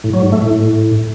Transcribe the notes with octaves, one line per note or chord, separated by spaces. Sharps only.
A2
F#3
G#2
A3
A2